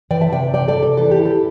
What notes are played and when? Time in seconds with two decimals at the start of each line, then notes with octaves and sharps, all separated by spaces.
0.11 E3 D5 G5
0.21 E5 A5
0.32 C3 D5 G5
0.54 C3 D5 G5
0.68 A4 D5
0.76 C3
0.83 A4
0.97 E3 A4
1.11 G4
1.19 E4
1.26 A4